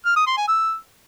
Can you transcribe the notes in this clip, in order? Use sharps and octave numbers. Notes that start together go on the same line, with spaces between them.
F6
D#6
C6
G#5
E6